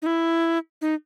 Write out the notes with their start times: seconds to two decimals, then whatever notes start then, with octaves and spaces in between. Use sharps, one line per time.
0.02 D#4
0.06 E4
0.81 D#4